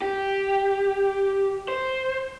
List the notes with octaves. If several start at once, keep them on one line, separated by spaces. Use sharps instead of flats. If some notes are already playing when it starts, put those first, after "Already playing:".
G4
C5